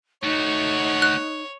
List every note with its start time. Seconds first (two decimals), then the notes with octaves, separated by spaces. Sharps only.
0.23 A3 D#4 F#4 C#5
1.02 F#6